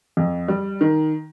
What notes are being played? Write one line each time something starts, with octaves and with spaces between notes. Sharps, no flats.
F2
G3
D#3